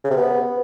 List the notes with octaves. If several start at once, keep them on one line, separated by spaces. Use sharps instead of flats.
C#3
C3
B3